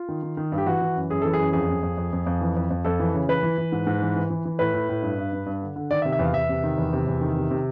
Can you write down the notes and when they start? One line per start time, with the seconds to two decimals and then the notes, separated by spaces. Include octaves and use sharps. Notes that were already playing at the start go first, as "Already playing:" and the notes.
Already playing: F4
0.09 D#3
0.23 D#3
0.37 D#3
0.52 G2
0.58 G4
0.66 E3 F#4
0.81 E3
0.95 F#2
1.10 F#2 G#4
1.22 E3 A4
1.33 G#4
1.39 F#2
1.53 F2 G#4
1.69 F2
1.82 F2
1.97 F2
2.13 F2
2.26 F2
2.41 E3
2.56 F2
2.70 F2
2.85 F2 A4
3.00 E3
3.14 C#3
3.28 E3 B4
3.43 E3
3.58 E3
3.72 G#2
3.87 G#2
4.02 E3
4.16 E3
4.30 E3
4.45 E3
4.59 A2 B4
4.74 A2
4.89 A2
5.03 G2
5.18 G2
5.32 G2
5.46 G2
5.62 D3
5.76 D3
5.91 D#3 D5
6.02 E5
6.05 C3
6.12 E5
6.19 E2 F5
6.34 E2 E5
6.49 C3
6.64 D#3
6.78 E2
6.93 C3
7.07 E2
7.21 D#3
7.36 C3
7.51 C3